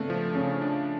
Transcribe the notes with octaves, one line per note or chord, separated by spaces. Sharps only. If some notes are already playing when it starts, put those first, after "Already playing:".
Already playing: C#3 A3 B3 C4 D4
F3
C#3 C#4
D4